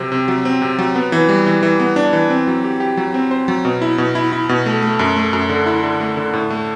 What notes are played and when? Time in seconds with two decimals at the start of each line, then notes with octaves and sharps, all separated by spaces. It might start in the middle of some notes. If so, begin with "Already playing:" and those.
Already playing: C3 F#3 C4
0.12 C3
0.28 F#3
0.45 C4
0.62 C3
0.79 F#3
0.95 B3
1.12 E3
1.29 G3
1.46 E3
1.63 E3
1.80 B3
1.96 D4
2.13 E3
2.30 C4
2.47 F#3
2.64 G4
2.80 G4
2.97 F#3
3.14 C4
3.31 C5
3.48 F#3
3.65 B2
3.82 E4
3.98 B2
4.15 E4
4.32 E4
4.49 B2
4.66 A3
4.83 A3
4.99 F#2
5.16 A3
5.33 F#2
5.50 D3
5.66 E4
5.83 D3
6.01 A3
6.17 D3
6.34 A2
6.50 A3